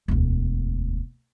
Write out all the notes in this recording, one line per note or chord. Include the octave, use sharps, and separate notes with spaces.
E1 D2